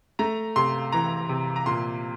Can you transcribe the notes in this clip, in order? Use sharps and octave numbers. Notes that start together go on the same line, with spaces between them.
A3 A#5
C3 C6
E3 A#5
C3
A#5
A#2 C6